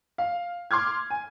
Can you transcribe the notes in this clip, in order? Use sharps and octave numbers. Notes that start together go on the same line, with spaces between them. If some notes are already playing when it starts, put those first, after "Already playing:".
F5
C6 D6 F6 G#6
G#5